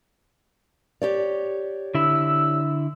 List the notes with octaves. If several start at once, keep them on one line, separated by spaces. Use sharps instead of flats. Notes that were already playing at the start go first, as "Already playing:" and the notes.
G4 C#5 D5
D3 E4 E6